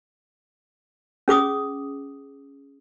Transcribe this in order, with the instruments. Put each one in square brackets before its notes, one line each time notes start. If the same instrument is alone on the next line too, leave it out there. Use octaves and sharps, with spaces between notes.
[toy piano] C#4 G#4 D6 D#6